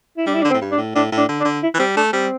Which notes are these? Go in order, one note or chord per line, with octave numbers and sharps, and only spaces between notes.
E4
G3 D4
E4
D3 D4
C4
A2
G2
D4
A2
A2 D4
A2
D4
D3
D4
D3
E4
E3
G3 C4
A3 D4
G3 C4